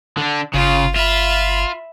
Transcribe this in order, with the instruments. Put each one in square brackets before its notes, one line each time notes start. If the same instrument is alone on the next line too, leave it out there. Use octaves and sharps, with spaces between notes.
[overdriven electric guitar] D3 D4
[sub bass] G1 [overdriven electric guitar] C#3 [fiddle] F4
[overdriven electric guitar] F4 [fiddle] E5 B5